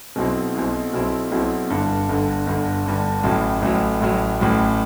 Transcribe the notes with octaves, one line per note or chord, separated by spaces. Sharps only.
B1 B2 F#3 C4 E4
B1 B2 F#3 C4 E4
B1 B2 F#3 C4 E4
B1 B2 F#3 C4 E4
G1 G2 D3
G1 G2 D3
G1 G2 D3
G1 G2 D3
A1 A2 F#3
A1 A2 F#3
A1 A2 F#3
A1 A2 F#3